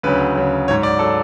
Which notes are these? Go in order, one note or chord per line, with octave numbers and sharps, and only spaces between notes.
D2 C#3 F#3 B4
D2 C#3 F#3
G#2 F#3 C#5
D5
F#3 A4